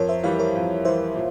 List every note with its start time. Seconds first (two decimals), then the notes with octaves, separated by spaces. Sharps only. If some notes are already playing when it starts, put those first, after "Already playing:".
Already playing: F2 A#4 C#5
0.09 C5 E5
0.23 E3 G3 C#5 F5
0.39 A#4 C#5
0.55 F2
0.85 E3 G3 C5 E5
1.16 A#2